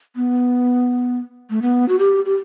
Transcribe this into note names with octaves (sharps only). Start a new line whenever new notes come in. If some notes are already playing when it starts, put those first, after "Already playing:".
B3
A3
B3
F#4
G4
G4